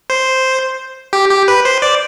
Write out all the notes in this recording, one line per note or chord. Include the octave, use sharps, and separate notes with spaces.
C5
G4
G4
B4
C5
D5